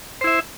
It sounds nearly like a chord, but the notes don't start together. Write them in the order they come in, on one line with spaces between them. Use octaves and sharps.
C5 E4 E5